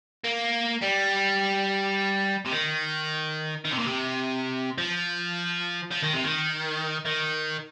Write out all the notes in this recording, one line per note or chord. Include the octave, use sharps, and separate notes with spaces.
A#3
G3
C3
D#3
D#3
C3
A#2
C3
F3
F3
D#3
C3
D#3
D#3